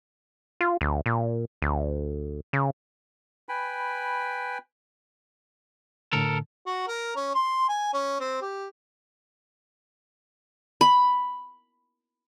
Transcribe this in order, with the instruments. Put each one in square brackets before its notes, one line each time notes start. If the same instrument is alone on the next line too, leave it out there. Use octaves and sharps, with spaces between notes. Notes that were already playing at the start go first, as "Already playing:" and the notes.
[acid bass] F4
D2
A#2
D2
C#3
[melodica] B4 G5 G#5 B5
[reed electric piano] A2 D3 [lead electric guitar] A4 A#4
[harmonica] F#4
A#4
C#4
C6
G#5
C#4
C4
G4
[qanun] B5